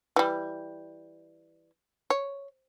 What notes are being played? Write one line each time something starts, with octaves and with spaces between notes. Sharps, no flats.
E3 G3
C#5